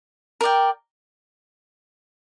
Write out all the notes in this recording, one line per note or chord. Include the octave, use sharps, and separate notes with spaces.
A#4 D5 G5